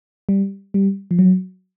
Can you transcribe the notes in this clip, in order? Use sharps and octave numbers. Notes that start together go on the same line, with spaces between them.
G3
G3
F3
F#3